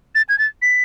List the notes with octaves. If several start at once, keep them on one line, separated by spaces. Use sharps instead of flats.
A6
G#6
A6
B6